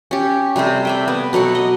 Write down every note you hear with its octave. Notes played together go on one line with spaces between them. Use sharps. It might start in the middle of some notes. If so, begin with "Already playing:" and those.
C#4 G4
C3 G3 A3 C5
D5 E5 G5
B3
B2 F#3 A4 F#5
D#5